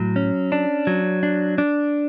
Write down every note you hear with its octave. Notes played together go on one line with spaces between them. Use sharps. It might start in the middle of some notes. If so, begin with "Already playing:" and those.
Already playing: A2 F#3
C#4
D4
F#3
D4
D4